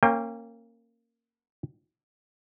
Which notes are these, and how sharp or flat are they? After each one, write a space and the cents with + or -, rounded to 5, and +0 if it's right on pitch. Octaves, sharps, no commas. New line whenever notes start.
A#3 -15 C#4 -20 G5 +25